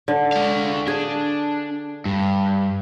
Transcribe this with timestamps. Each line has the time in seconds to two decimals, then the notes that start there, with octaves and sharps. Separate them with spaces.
0.08 D3
0.32 G#3 F5
0.88 D4 G#4
2.06 G2